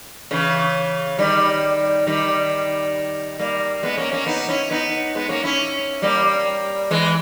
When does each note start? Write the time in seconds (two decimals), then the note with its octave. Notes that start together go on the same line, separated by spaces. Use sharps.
0.31 C#3 E3
1.19 D#3 G3
2.06 D#3 G3
3.39 G3 A#3
3.83 G#3 B3
3.97 A#3 C#4
4.12 A#3 C#4
4.27 B3 D#4
4.48 C#4 E4
4.71 B3 D#4
5.15 G#3 B3
5.29 A#3 C#4
5.44 C#4 E4
6.02 G3 A#3
6.91 E3 G#3